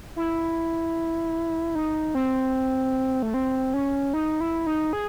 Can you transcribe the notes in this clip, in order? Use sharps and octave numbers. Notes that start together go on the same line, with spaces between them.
E4
D#4
C4
A3
C4
C#4
D#4
E4
D#4
G#4